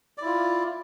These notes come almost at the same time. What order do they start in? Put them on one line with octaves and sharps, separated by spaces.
D5 E4 F4